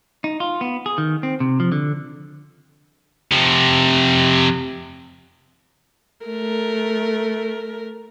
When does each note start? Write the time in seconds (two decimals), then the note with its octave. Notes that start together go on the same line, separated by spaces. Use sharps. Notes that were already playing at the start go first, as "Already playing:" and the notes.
0.24 D#4
0.40 F4
0.61 B3
0.86 G#4
0.98 D#3
1.23 C4
1.40 C3
1.60 F3
1.72 D3
3.32 C3 F3
6.26 A3 A#4